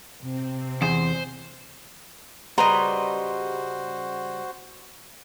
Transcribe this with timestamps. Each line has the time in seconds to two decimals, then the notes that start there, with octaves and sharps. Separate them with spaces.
0.22 C3 C4
0.82 E2 C5
2.58 C#3 G3 F#4 B4 C5 D#5 A#5 C6